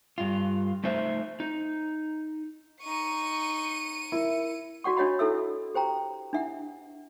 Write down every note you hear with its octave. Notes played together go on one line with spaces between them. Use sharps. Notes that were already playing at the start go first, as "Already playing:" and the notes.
G2 F4
A3 D#4 C5 E5
D#4
D#4 C#6 C#7 D#7
E4 A#4 E5
F#4 D5 F#5 C#6
D4 F#4 C#5 D#5 F#5 B5
D4 E4 A4 E5 E6
G4 C5 G5 A#5
D4 E4 E5 F#5